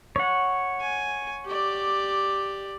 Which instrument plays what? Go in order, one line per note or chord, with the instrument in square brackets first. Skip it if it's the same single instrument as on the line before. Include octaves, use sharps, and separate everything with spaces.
[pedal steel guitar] C#5 F#5
[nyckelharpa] G#5
G4 D5